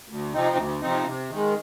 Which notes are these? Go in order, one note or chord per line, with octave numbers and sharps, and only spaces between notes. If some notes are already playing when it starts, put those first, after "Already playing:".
D2
C3 F3 C4 D#4
D2
C3 F3 C4 D#4
C3
D#3 G#3